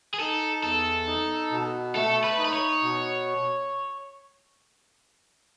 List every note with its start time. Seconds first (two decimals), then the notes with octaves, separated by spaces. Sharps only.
0.14 G#4
0.19 D#4 A4
0.63 E2 A4
1.07 D#4
1.51 B2
1.95 A3 A4
2.24 B4
2.39 D#4
2.45 B4
2.53 C#5
2.83 B2